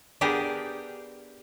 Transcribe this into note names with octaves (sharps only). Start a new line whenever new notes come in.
B3 D4 G4 G#4 A#4